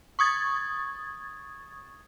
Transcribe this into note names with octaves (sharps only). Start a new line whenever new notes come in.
C#6 D#6 G#6 A6